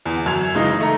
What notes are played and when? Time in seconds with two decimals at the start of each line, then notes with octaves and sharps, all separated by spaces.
0.06 E2
0.26 F#2 G#6 F7
0.54 C#3 E3 G#3 D#4
0.80 A3 A#5